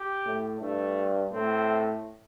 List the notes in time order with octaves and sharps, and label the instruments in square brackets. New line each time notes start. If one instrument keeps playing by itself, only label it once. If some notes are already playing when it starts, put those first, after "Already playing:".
Already playing: [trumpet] G4
[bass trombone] A2
[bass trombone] G2 [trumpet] A3
[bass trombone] A2 [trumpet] C4